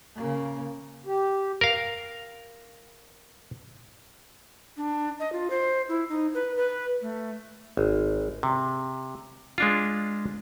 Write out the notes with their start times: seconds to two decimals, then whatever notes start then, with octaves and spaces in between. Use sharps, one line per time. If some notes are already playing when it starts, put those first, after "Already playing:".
0.15 C#3 A#3
1.06 G4
1.61 A#4 F5
4.77 D4
5.20 D#5
5.33 F4
5.50 C5
5.89 E4
6.09 D#4
6.34 B4
6.57 B4
7.02 A3
7.77 G#1
8.43 C3
9.58 G#3 D4 F4